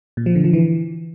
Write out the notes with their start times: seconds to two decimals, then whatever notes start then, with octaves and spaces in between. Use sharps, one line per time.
0.17 A#2
0.26 F3
0.35 D3
0.44 F3
0.53 E3